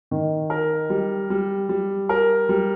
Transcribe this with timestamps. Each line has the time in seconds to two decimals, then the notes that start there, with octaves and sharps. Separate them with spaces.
0.11 D#3
0.50 A#4
0.90 G3
1.30 G3
1.69 G3
2.09 A#4
2.49 G3